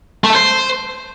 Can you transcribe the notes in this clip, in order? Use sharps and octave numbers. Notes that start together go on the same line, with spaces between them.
A3
A4
C5